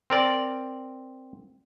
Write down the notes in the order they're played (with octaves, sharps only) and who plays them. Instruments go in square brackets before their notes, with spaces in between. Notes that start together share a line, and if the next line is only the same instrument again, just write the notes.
[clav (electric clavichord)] C4 A#4 D5